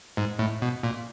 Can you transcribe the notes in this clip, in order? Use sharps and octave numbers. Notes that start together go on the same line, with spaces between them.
G#2
A2
B2
A#2